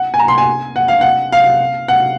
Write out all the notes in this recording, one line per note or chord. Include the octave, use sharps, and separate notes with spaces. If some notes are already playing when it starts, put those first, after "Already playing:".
Already playing: F#5
G#5
A#5
C6
G#5
F#5
F5
F#5
F5
F#5